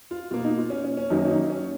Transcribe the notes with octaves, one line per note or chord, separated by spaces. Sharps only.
F4
B2 A#3 F4
D#4
F4
C#4
C#4
C#4
F#2 D#3 F#3 A#3 D#4
C#4
D#4
C#4